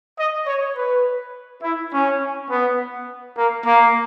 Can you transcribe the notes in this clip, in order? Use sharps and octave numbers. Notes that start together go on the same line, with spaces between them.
D#5
C#5
B4
E4
C#4
B3
A#3
A#3